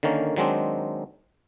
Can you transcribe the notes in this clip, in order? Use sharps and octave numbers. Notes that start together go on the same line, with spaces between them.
D3 D#3 A#3 C#4
D#3 F#3 G#3 C4 D4